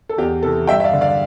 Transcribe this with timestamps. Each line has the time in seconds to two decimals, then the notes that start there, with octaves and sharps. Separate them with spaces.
0.09 A4
0.18 E2 G4
0.43 C3 E3 A4
0.67 G2 E5 G5
0.80 E5
0.84 D5 F5
0.93 D3
1.01 D5 F5